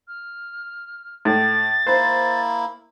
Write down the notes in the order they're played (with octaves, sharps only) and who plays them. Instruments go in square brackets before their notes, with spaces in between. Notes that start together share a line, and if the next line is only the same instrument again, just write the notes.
[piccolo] F6
[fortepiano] A2 [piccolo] A6
[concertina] A#3 E4 [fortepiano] C5